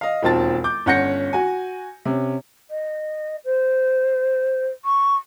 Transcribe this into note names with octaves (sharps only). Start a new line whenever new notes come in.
D#5 F5
E1 D#2 C4 F4 A5 A6
D6 G6
G1 C#4 F#5 G6 A#6 C#7
F#4 G#5
C3 C#4
D#5
C5
C#6